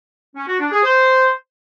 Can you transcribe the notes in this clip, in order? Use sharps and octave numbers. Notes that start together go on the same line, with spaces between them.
C#4
F#4
D4
G#4
C5